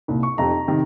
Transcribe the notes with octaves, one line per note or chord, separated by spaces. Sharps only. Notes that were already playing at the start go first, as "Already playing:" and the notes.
C2 A#2
C#6
F1 F2 C3 A#5
C3 D#3